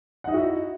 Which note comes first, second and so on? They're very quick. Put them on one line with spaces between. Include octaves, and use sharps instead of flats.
F#5 D#4 E4 F#4 E5